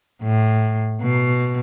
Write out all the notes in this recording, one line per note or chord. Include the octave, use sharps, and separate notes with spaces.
A2
B2